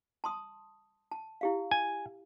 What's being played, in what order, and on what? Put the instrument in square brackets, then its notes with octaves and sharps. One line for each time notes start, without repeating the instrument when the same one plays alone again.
[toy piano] A5 C6 D#6
A5
E4 G4 F5
[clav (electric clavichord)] G#5